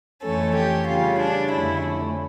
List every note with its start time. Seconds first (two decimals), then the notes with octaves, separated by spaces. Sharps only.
0.23 F2 E3 A3 C#4 A4
0.56 G4
0.87 C#3 G3 C#4 F4
1.20 D4
1.51 F2 D3 A3 C#4 E4